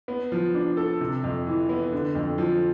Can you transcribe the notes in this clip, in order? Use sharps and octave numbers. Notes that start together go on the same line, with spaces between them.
B3
F3
D4
A4
C3
F2
E3
B3
D3
F2
F3